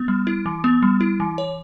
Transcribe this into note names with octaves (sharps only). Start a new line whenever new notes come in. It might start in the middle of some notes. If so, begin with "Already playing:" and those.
Already playing: B3
G3
E4
E3
B3
G3
E4
E3
C#5